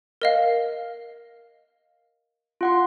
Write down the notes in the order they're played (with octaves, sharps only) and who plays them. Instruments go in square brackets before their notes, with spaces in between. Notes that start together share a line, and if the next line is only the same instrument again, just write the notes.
[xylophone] A#4 D#5 F5
[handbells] F4 F#5 C6